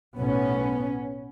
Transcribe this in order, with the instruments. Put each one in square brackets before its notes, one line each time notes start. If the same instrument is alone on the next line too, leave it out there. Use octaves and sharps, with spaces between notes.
[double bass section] B1 A2 B3 C#4